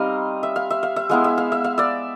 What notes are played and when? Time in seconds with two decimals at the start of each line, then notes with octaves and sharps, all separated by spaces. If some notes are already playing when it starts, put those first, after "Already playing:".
Already playing: G3 C4 D#4 D#5 F5
0.43 E5
0.56 F5
0.70 E5
0.83 F5
0.96 E5
1.09 G#3 B3 E4 F5
1.24 E5
1.38 F5
1.52 E5
1.64 F5
1.78 D5 E5